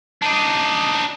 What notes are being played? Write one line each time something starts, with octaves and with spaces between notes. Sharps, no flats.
D4 D#4